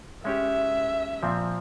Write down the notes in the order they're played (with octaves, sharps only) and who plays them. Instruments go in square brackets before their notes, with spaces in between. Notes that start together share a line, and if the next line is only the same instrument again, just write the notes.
[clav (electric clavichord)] G#3 C#4 G4 [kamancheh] E5
[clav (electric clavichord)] A#2 F3 C4